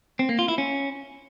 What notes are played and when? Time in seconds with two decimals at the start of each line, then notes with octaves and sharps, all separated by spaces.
0.19 C4
0.29 A#3
0.39 F4
0.48 E4
0.58 C#4